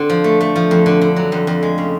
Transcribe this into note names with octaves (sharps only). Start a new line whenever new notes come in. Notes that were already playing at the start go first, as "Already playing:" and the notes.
Already playing: D3 C4
F3
A3
A3
F3
F2
D3
D3
F#3
F2
F2
G#3
C#3